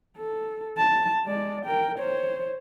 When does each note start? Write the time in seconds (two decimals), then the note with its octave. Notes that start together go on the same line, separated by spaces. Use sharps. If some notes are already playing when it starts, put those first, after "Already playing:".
0.17 A4
0.78 A5
1.26 G#3 D5
1.65 A#4 G5
1.98 C5 C#5